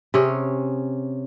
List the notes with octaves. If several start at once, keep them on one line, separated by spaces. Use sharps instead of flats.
C3 C#4 G#4 C#5